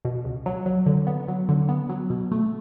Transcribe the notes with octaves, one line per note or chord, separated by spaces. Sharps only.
B2
C#2
F#3
F#3
D3
B3
F#3
D3
B3
F#3
B2
A3